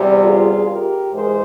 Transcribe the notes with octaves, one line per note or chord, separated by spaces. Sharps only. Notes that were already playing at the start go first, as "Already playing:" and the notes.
Already playing: E2 C3 G3
F4 G#4
G4 A#4
G#2 E3 G#3 G#4 C5